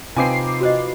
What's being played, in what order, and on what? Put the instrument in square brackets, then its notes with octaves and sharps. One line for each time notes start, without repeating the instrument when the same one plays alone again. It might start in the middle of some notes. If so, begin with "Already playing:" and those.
[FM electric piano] C3 D6 C7 [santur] F3 D#4 B4 [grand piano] C4 G#5
[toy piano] F#4 C5 D#5